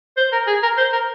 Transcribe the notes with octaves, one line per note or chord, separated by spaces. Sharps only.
C5
A#4
G#4
A#4
C5
A#4